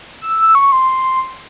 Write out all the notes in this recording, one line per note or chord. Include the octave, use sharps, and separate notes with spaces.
E6
E6
C#6
C6